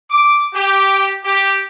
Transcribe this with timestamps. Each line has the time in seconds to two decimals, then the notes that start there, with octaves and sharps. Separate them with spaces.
0.10 D6
0.54 G4
1.24 G4